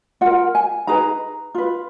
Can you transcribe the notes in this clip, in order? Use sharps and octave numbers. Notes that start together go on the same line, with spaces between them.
F4 A#4 F#5
G#5
D#4 G#4 B4 A#5
F4 B4